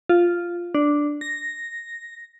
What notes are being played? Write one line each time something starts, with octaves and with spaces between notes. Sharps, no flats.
F4
D4
A#6